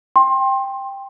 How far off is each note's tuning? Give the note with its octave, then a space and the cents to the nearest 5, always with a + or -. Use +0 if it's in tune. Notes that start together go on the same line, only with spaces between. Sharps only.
G5 +10 C6 +25